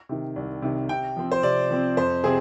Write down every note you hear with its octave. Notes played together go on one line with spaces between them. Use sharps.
C3 D#3
C2
C3 D#3
C3 G5
F3 C4
C5
C3 D5
F3 C4
F2 C5
C3 F3 C4 G#4